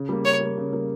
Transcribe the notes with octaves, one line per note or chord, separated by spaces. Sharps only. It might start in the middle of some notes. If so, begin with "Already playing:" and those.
Already playing: C#3
G3 A#3
C#3 C#5
G3 A#3
C#3
G3 A#3